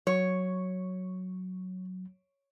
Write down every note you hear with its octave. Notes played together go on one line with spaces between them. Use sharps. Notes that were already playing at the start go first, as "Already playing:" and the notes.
F#3 C#5